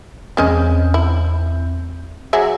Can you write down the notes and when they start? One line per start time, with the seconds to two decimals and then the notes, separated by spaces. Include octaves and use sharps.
0.37 E2 G#3 C4 C#4 D#5 G6
0.94 E4
2.33 F#3 G#4 E5